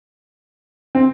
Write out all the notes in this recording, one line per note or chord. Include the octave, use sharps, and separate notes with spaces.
C4